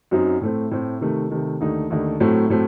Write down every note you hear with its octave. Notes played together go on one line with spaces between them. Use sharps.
F#2 F#3 C4 D#4
A2 A3 C4
A2 A3 C4
C3 D#3 A3
C3 D#3 A3
D#2 D3 A3 D#4
D#2 D3 A3 D#4
A2 F#3 A3 C4
A2 F#3 A3 C4